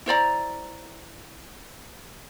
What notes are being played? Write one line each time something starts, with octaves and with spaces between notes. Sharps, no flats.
E4 C5 D5 A#5